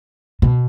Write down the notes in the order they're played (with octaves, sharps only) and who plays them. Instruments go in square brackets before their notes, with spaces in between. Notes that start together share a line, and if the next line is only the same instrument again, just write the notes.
[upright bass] B2